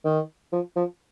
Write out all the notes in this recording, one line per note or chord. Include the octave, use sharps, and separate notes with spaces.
D#3
F3
F3